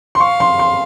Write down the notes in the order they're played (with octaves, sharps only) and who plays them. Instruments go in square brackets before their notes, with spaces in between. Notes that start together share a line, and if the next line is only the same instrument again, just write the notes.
[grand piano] C6
[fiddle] F5 [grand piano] C#6
[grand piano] C6
C6